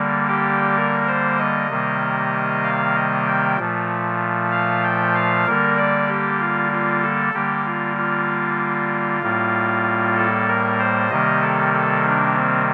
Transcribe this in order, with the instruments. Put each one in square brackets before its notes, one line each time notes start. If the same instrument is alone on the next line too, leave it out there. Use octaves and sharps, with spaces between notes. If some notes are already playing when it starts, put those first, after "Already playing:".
Already playing: [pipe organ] D3 G3 A#3
G4
A#4
C5
D#5
C3 D#3 G3 A#3
F5
D#5
G5
A#2 F3 A3
F5
G5
F5
D3 G3 A#3 A#4
D5
G4
F4
F4
A4
D3 G3 A#3 G4
F4
F4
A2 G3 A#3
A4
A#4
C5
C3 D#3 G3 A#3 D#5
A4
A4
D4
C4